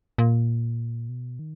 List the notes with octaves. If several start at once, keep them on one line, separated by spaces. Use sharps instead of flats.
A#2
B2
D#3